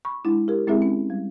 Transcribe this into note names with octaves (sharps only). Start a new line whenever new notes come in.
B5 C#6
G#3 D4 E4
G4 A#4
G#3 C4 E4 G#4 E5
C#4
G3